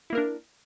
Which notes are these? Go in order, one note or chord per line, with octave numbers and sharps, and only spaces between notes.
A#3 D4 E4 A#4